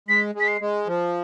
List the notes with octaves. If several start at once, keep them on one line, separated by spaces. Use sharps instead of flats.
G#3 B6
G#3
B6
C7
G#3
F3